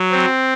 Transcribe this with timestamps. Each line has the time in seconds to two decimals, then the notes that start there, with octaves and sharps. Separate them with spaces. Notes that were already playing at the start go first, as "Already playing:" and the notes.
Already playing: F#3
0.12 C4